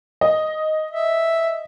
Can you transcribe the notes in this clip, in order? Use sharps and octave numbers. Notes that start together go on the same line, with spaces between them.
D#5
E5